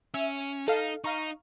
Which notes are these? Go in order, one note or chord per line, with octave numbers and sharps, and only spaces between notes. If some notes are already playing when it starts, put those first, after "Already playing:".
C#4 E5
D#4 A4 F5
D#4 F5 A#5 C#6